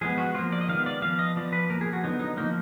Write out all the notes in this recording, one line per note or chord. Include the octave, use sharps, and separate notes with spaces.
F3 G#3 B3 G#4
F#4
F3 A#3 F4
D5
D#5
D#3 G#3 B3 F5
D5
F3 B3 F5
D#5
F3 B3 D5
B4
F3 A#3 A#4
G#4
F#4
D3 F#3 B3 D#4
D#4
F3 A#3 D#4